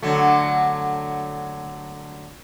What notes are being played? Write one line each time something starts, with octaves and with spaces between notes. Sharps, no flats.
D3 F#3 A3